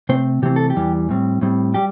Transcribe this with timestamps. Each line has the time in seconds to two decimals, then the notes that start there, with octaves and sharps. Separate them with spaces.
0.09 C3 A3 C4 C5
0.42 C3 E3 A3 C4 G4
0.56 A4
0.70 G4
0.76 E2 E3 G3
1.09 A2 G3 C4
1.41 A2 G3 C4
1.74 G3 G4